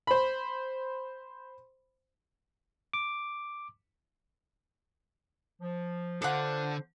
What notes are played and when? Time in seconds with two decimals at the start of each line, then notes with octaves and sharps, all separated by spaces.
0.07 C5 B5
2.93 D6
5.60 F3
6.22 D3 D4 F4 A4 C5 F#5